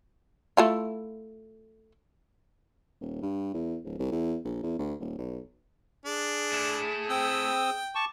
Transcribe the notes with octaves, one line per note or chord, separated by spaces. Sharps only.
A3 E4 F4
D#1
G2
E2
D1
C2
E2
A#1
E2
D2
D#1
B1
D4 G#4
A3 E4
C4 G5 D#6 E6
A5 C#6 D6